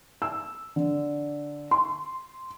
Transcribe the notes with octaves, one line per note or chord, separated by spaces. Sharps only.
E6
D3
C6